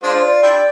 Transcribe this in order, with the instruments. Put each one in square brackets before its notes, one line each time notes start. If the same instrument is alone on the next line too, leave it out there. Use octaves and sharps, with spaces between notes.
[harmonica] G#3 D4 F4 [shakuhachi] C5
[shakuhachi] D5
[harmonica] D4 E4 G4